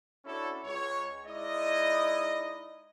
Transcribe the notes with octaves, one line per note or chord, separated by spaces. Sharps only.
C#4 D4 E4 F#4 A4
C#2 C#5
G#3 D#4 E4 D5 D#5